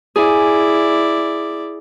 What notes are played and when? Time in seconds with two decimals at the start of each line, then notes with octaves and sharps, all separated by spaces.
0.16 E4 G#4 D5